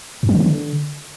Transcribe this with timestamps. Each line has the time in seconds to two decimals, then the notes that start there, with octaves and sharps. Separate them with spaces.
0.23 F#2
0.29 F#3
0.35 D3
0.40 E3
0.46 D3